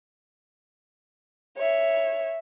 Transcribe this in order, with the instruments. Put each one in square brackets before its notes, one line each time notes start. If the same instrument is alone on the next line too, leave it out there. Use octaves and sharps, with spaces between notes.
[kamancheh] C#5 E5